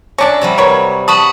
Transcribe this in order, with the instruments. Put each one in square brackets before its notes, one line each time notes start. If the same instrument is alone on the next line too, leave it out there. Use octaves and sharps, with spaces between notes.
[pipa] C#4 D4 [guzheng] E5 A5 A#5
[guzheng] C3 F#3 G3
[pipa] A#4 B4 C#5
[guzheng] B4 F#5 B5 [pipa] A5 [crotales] C#6 D#6